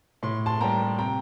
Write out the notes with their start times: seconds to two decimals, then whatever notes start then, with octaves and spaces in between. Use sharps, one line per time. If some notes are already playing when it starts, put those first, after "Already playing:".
0.23 A2 C6
0.46 A5 C6
0.61 G3 A#3 G5 A#5
0.98 C3 G5 A#5